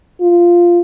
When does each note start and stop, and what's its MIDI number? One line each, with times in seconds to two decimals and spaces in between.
0.21 0.81 65